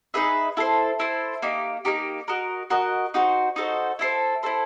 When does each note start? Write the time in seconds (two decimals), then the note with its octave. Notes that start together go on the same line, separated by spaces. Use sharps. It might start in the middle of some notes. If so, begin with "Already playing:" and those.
0.14 D#4 G#4 B4 E5
0.57 E4 A4 C5
1.00 E4 A4 C5
1.42 A#3 D#4 G4
1.85 A#3 D#4 G4
2.28 F#4 A#4 D#5
2.70 F#4 A#4 D#5
3.14 D#4 F#4 A4 C5
3.56 D#4 F#4 A4 C5
3.99 E4 A4 C5
4.43 E4 A4 C5